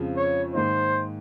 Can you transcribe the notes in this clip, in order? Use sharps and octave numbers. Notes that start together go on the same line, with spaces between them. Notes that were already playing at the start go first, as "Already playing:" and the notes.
Already playing: F2 C#3 F3 G#3
C#5
G#2 D#3 A#3 D#4 C5